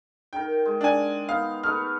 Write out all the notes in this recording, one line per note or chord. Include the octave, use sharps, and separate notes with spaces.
D#3 A#4 G5
G#3
D4 G#5
B3 D#4 F5
A3 D#4 B4 F6